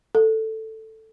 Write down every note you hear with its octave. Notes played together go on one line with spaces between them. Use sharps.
A4